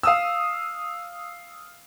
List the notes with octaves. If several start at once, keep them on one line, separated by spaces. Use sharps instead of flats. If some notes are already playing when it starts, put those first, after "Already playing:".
F5 D#6 E6